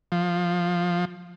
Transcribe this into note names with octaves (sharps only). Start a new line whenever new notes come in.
F3